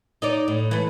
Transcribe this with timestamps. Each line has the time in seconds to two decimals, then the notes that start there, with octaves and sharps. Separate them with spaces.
0.22 D#4 C#5 D5
0.48 A2
0.71 E3 A3